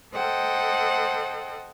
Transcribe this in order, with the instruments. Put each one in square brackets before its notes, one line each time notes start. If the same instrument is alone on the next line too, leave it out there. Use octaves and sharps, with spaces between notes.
[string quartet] A4 C5 D#5 F#5 G5